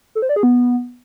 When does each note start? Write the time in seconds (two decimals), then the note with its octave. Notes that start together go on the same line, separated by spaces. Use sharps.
0.15 A4
0.22 C5
0.29 D5
0.36 G#4
0.43 B3